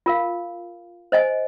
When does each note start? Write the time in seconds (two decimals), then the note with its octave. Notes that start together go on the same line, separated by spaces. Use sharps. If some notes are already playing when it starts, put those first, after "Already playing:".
0.06 F4 A#4 F5
1.12 C5 D#5 G#5